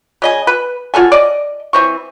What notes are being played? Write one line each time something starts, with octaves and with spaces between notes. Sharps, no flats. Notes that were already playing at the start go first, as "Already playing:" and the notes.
C#3 D#5 G#5
B4
F4 F#4 A4 G#5
D5 D#5
E3 C4 C#6